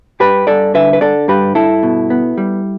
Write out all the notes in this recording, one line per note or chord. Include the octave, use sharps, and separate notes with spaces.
G2 G4 B4
G2 A4 D5
D3 B4 E5
B4
D3 A4 D5
G2 G4 B4
G2 E4 A4
B2
B3
G3